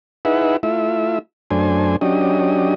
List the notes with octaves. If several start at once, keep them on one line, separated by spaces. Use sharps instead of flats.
D#4 E4 G#4 B4 E5 F#5
A3 E4 F4 E5
F#2 A3 D4 C5 G#5
F#3 C#4 D4 G4 D#5